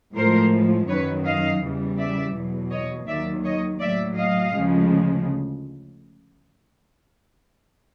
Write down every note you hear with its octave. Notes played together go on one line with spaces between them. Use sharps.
A2 F3 G#3 A#4 C5
F#2 D#3 F#3 B4 C#5
D#5 F5
E2 C#3 E3 G3
D5 E5
E2 B2 F#3
C#5 D#5
D#2 D#3 F#3 D5 E5
C#5 D#5
A2 F#3 D5 E5
D#5 F5
D2 C#3 F3 G#3